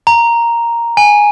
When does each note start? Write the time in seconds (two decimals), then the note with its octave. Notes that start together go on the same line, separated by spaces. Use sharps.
0.07 A#5
0.97 G#5